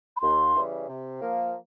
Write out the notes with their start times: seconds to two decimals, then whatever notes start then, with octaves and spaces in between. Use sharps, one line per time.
0.17 B5
0.21 D#2 C6
0.55 C#3 E3 G3
0.88 C3
1.21 F3 A#3